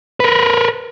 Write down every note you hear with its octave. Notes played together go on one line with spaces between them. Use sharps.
A#4 B4